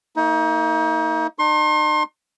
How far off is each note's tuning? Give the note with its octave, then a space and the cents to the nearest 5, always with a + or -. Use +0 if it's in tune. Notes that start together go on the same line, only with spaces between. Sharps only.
A#3 -30 D#4 +35
D#4 -45 C6 +35